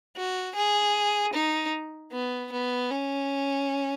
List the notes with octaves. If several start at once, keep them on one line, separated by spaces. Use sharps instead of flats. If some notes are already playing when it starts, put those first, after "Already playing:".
F#4
G#4
D#4
B3
B3
C#4